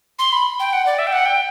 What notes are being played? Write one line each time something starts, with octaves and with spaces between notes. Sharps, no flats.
C6
B5
G5
F#5
D5
E5
G5
F#5
G5